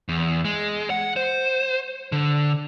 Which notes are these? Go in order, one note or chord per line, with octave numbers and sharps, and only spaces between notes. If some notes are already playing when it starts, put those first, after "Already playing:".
E2
G#3
F#5
C5
D3